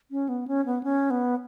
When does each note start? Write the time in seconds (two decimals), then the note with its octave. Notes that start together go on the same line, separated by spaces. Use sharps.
0.11 C#4
0.29 B3
0.48 C#4
0.66 B3
0.83 C#4
1.11 B3